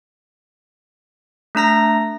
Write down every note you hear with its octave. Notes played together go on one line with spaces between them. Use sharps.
A3 D4 A#5 A#6